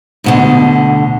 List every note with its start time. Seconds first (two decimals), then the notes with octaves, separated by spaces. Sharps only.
0.24 D2 B2 D3